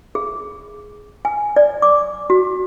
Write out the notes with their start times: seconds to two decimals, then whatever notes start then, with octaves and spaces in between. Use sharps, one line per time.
0.15 G#4
1.25 G#5
1.56 D5
1.82 D6
2.30 F#4